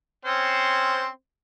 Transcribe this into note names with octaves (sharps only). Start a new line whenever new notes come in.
C4 C#4 C5